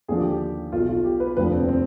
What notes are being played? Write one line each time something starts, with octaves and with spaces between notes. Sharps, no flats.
D#2 D3 F3 G#4
G4
G4
B1 B2 F4
F4
G4
B4
F1 D#2 D3 F3 B4
C4
C4